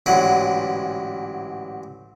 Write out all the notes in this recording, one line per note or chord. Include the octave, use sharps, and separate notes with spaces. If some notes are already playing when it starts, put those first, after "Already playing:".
A1 G#2 D3 E3 F#3 F#5